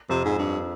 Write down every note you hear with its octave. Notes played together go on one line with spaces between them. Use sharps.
F2 C3
G#2
G2